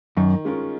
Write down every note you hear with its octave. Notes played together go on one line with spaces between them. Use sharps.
F#2 D#3
G#3 C#4 F4 A#4